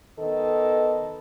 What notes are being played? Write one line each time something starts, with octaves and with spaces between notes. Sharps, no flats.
D#3 B3 A4 D#5